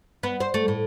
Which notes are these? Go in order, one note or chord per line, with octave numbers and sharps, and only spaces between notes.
B3
C5
A3
A2